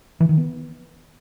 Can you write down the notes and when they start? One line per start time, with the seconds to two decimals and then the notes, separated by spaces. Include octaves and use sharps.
0.20 E3
0.29 D#3
0.37 B3